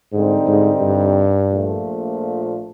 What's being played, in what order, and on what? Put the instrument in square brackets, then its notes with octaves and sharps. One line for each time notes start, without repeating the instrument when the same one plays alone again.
[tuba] G#2 [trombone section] D3 G3 C4 D#4
[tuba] G#2
G2
[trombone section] A#1 A#2 F3 A3